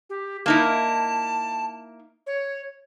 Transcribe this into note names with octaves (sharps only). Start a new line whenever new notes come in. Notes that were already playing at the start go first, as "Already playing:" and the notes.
G4
A#3 D#4 E4 A5
C#5